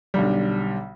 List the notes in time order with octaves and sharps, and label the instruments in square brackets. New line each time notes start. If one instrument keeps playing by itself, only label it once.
[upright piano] B1 D3 G3